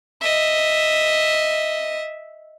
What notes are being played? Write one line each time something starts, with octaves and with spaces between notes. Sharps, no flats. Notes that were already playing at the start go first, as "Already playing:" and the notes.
D#5 E5